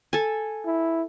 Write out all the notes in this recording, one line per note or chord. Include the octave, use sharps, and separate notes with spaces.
A4 G#5
E4